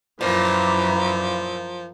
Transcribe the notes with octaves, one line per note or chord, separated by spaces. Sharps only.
F#2 A#2 E3 F3